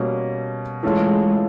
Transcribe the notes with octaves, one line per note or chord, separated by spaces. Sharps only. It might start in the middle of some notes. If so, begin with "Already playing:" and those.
Already playing: B2 G3 A#3 C#4
E3 G#3 A3 C#4 F4